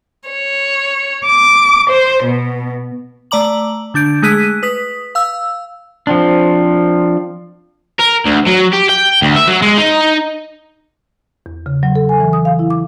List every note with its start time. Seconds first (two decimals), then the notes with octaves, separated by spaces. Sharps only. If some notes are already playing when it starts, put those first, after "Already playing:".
0.30 C#5
1.27 D6
1.91 C5
2.24 B2
3.31 A3 D5 A#5 D6 F#7
3.94 D3 D4 G6 D7
4.22 G#3 A3 G#4 F#6 B6 D#7
4.63 B4 D#6 B6
5.15 F5 E6
6.07 F3 C4 D4
8.00 A#4
8.25 D2
8.46 F#3
8.73 G4
8.89 G5
9.22 D2
9.36 E5
9.47 F#3
9.62 G#3
9.78 D#4
11.46 E2
11.66 C#3
11.83 F#3
11.96 A4
12.09 G#5
12.20 E3
12.33 D#6
12.45 F5
12.59 E4
12.70 D6